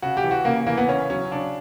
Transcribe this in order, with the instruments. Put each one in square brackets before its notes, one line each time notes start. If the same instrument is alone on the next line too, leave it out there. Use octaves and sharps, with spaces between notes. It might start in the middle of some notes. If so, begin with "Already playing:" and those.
[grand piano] C#3 F#4
G4
E3
F#4
C#3 A#3
E3 A#3
B3
C#3 C#4
F#3 C#4
C#3 D4